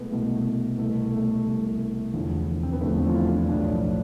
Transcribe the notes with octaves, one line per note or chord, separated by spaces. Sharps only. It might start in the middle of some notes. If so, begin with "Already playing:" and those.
Already playing: C2 B2 G#3 A3 B3
C2 B2 A3
C2 B2 A3
A3
C2 B2
F1 E2 D3 F3
C4
B3
F1 E2 D3 F3 A3
C4
F4
E4
D4
B1 A2 F3 D4
E4